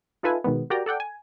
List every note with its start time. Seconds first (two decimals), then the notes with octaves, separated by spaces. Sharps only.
0.23 D#4 F4 A4 B4 E5 G#5
0.44 B2 D#3 G#3 B3
0.70 F#4 G4 A#4 D5 G5 A#5
0.86 A4 D5 F#5 G5
1.00 G#5